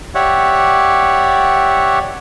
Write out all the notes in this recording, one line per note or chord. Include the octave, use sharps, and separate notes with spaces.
G4 C#5 D5 E5 F#5